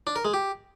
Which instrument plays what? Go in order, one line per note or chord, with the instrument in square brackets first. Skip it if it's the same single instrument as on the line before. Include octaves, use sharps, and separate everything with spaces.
[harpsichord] D4
A#4
G#3
G4